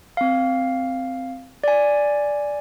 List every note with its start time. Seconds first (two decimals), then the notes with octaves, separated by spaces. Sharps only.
0.17 C4 F5
1.64 D5 G#5